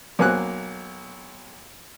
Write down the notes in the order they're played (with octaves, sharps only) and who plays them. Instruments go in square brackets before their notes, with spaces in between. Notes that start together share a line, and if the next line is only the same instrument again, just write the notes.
[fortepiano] B1 A#3 G#5 F#6